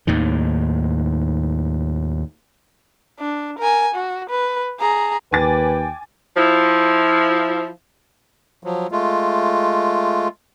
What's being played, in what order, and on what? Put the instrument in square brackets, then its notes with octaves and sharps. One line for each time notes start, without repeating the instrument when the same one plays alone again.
[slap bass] D#2 A2 D#3
[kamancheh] D4
A#4 G#5
F#4
B4
G#4 A#5
[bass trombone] D#2 [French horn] B4 [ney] G5 [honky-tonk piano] G#5 D6 A6
[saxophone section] F3 E4
[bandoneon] F3 F#3
G#3 A3 F4